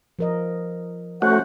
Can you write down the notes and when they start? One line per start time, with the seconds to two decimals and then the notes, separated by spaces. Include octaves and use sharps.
0.19 F3 A#4 D#5
1.22 A3 C#4 F#4 C5 F#5